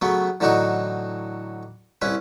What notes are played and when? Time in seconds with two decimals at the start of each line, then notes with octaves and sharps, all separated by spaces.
0.02 C#3 F#3 A3 B3
0.40 A2 D3 E3 F#3 D#4 F#4
2.02 C2 C#4 E4 B4